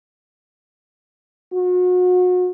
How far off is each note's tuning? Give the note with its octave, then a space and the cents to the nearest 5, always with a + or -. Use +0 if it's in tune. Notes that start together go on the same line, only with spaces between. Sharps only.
F#4 -35